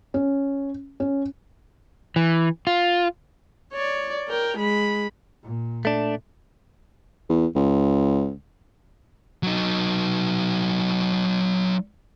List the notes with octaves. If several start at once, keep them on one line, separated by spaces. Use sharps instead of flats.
C#4
C#4
E3
F4
C#5 D5
A#4 G5
G#3 B5
A#2
A3 D4
E2
C#2
F#3 D#4